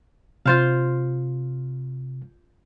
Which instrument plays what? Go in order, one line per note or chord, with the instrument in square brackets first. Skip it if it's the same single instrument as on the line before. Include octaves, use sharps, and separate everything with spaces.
[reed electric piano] C3 [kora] F4 C5 F5